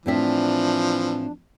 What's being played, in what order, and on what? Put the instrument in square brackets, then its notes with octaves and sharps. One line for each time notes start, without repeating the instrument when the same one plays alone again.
[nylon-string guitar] A2 C4 E5 [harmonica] E3 F3 [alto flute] D4